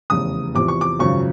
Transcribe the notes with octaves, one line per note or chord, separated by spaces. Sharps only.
F1 E2 C#3 D#6
E2 C3 F3 D6
C#6
D6
G#1 F#2 C#3 F3 C#6